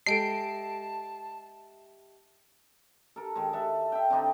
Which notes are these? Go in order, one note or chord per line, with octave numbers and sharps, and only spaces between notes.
G#3 G4 A4 D#5 E5 A5 C7 D7
A4 A#4
D#3 G#3
A4 E5 F#5
E5 G5
D3 C4 D4 D#4